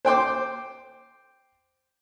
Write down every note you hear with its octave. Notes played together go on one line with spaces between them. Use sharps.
C5 G5 C6 D6